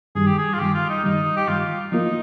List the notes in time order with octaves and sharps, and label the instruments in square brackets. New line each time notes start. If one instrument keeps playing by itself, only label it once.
[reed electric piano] G2 D#3 G3 [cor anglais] G#4
[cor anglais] G4
G#4
F4
[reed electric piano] G2 D#3 G3 [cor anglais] G4
[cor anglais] F4
D#4
[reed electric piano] G2 D#3 G3 [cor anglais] D#4
[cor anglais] G4
[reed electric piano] G2 D#3 G3 [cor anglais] F4
[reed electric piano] F3 A#3 F4 [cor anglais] D#4